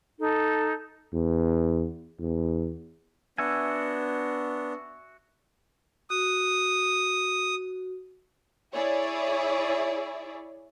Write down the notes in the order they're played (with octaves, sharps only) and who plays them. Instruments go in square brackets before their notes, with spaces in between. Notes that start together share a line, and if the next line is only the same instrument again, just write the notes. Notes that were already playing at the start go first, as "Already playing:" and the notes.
[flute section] D#4 A4
[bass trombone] E2
E2
[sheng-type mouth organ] B3 D4 [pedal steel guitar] F#4 E5 G#5
[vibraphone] F#4 [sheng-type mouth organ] D#6
[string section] E4 G#4 C#5 D5 E5